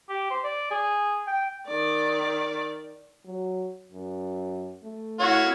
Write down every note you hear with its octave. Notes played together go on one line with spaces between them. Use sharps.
G4
C5
D5
G#4
G5
D#3 D5
F#3
F#2
A3
E4 F#4 C#5 F5